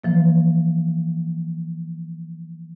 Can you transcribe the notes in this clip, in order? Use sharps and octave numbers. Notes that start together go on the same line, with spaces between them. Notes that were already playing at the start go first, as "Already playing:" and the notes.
E3 F3 A#3